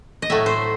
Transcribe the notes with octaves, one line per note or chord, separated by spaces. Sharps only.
D#5
A2 F#3 A3 E5
C5